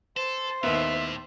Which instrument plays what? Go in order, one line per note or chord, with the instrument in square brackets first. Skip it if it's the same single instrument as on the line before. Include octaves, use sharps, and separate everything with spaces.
[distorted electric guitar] A4 [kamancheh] C5
[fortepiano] D#2 B3 [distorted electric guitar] A2 [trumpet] E5